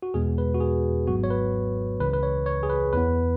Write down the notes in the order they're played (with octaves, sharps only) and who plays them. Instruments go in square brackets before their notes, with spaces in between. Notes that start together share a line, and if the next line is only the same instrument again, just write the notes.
[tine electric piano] F#4
E2 B2 G#3 B3 G#4
B4
F#4
G#4
G#1 G#2 F#3 B3 F#4
C#5
B4
C#2 C#3 E3 B4
B4
C#5
C#5
G#4
B4
E2 E3 B3 B4